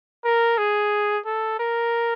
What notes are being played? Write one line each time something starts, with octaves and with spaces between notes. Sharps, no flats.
A#4
G#4
A4
A#4